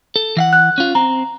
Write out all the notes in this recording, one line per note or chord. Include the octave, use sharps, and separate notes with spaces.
A4
E3 F5 F#5
F#6
C#4 F4
C4 A#5